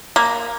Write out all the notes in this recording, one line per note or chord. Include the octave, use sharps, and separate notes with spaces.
A#3